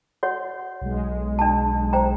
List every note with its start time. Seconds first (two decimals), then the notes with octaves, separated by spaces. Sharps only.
0.23 F#4 C#5 F#5
0.81 B1 G#3
1.39 D4 A5
1.93 C5 G5 A#5